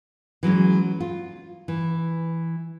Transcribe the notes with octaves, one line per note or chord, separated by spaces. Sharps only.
E3 F#3 G#3 C#4
F4
E3